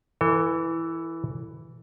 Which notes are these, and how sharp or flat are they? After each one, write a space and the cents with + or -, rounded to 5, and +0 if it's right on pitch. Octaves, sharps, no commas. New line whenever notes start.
E3 +0 A4 +35